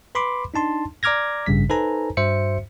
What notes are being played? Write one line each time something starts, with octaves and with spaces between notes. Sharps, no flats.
B4 B5 C6 D6
D4 D#4 A5 C6
D5 A#5 D6 F6 G#6 A#6
A1 G2 C#3 G3 B6
D#4 A4 B4 C5 G#5 A#5
G2 F#4 C5 E5 C#7